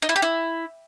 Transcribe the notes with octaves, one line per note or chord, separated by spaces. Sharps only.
D#4
E4
G4
E4